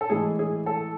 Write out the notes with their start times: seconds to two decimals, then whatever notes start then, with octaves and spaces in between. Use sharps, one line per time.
0.01 A4
0.10 A2 E3 G#3 G#4
0.39 G#4
0.66 A4